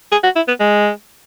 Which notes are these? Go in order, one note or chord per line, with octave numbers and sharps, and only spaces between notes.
G#4
F#4
E4
B3
G#3